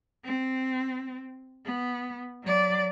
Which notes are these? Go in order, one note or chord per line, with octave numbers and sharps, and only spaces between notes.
C4
B3
F#3 D5